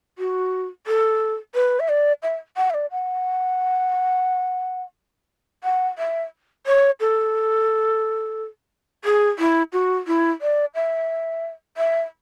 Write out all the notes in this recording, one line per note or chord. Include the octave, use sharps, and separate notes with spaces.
F#4
A4
B4
E5
D5
E5
F#5
E5
D5
F#5
F#5
E5
C#5
A4
G#4
E4
F#4
E4
D5
E5
E5